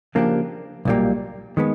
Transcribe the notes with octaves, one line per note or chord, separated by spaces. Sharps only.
C#3 F3 A#3 D4 G4
B1 A#2 G3 A#3
D#3 G#3 B3